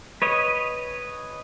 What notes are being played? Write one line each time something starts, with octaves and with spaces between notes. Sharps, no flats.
B4 C#5 D#5